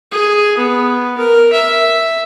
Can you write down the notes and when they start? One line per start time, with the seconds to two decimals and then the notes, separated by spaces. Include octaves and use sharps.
0.12 G#4
0.57 B3
1.18 A#4
1.52 E5